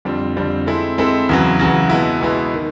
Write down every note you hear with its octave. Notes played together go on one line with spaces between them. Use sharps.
F2 D3 G3 C4
F2 D3 G3 C4
G#3 C4 E4 A4
G#3 C4 E4 A4
E2 C#3 F#3
E2 C#3 F#3
B2 G#3 B3 E4
B2 G#3 B3 E4
D#3